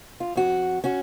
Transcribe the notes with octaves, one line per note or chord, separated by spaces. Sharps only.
F4
F2 F#4
C#4 F#4